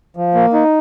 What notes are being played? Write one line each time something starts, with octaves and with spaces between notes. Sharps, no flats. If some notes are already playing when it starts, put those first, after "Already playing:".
F3
A#3
D#4